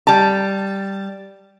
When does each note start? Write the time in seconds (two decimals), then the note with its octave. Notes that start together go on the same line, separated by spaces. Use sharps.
0.07 G3 A5